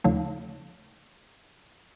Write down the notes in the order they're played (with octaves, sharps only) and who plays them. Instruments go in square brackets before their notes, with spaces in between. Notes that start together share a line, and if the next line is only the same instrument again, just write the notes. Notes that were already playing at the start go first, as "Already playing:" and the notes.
[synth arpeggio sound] D#2 C#3 F3 A3